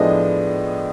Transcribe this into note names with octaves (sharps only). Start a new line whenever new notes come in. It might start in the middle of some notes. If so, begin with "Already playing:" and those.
Already playing: A2 F3 G#3 B3 D4 D#5